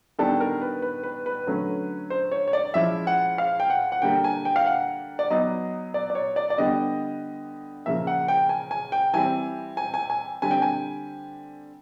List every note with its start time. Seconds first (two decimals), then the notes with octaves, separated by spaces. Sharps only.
0.19 D#3 G3 B3 D4 A4
0.41 A#4
0.62 B4
0.82 B4
1.03 B4
1.26 B4
1.47 D3 F#3 A3 C#4
2.10 C5
2.31 C#5
2.48 C#5
2.53 D5
2.74 F3 G#3 C#4 E4 E5
3.07 F#5
3.38 F5
3.60 G5
3.70 F#5
3.92 F#5
4.02 D3 G3 A#3 G5
4.24 G#5
4.45 G5
4.56 F5
4.66 F#5
5.19 D5
5.30 F#3 B3 D#4 D#5
5.94 D5
6.10 D5
6.15 C#5
6.36 D5
6.50 D5
6.58 D3 G3 B3 D#5
7.86 C#3 F3 A#3 E5
8.07 F#5
8.28 G5
8.49 G#5
8.71 G#5
8.92 G5
9.13 E3 G3 C4 G#5
9.77 G#5
9.94 G#5
10.10 G#5
10.42 D3 G3 C4 G#5
10.51 G5
10.62 G#5